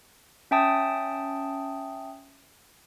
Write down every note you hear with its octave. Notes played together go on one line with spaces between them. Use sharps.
C#4 E5 G5 A5 D#6